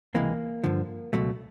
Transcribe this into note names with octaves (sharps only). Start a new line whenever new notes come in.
C#2 C3 E3 G#3 A#3
G2 D3 F3
C#2 B2 F#3 A3